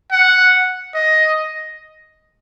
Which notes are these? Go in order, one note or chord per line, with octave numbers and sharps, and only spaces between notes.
F#5
D#5